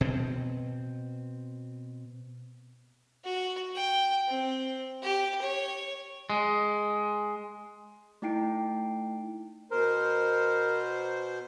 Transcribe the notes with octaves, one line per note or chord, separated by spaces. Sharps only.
B2 C4
F#4
G5
C4
G4
C#5
G#3
A3 D#4 E4 G5 C7 D7
B2 A#4 C5